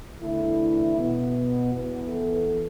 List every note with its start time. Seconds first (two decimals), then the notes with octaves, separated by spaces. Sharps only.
0.21 E2 D3 A3 E4
0.96 B2 B3
1.72 E2 E3 B3
2.08 A4